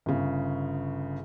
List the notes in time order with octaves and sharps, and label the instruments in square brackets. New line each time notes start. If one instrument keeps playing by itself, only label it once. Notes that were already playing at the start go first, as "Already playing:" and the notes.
[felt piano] G1 C#3